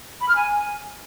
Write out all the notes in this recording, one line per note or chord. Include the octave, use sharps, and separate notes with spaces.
B5
F6
G#5